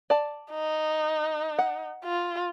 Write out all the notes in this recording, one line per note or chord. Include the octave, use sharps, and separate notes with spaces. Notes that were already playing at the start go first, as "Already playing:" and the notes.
D5 A5
D#4
F#5
F4